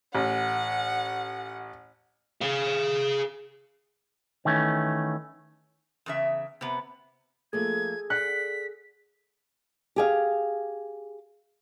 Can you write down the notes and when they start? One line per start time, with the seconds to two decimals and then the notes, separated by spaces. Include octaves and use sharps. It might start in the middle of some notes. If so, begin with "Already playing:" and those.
0.15 A1 F#5
2.41 G#4 F5
4.45 D#3 E3 A3 C#4
6.06 E2 C#3 E5
6.61 C3 B3
7.53 F3 A3 A#3 G#4 A4 G#6
8.10 D5 F#5 F#6 B6
9.96 G4 G#4 F5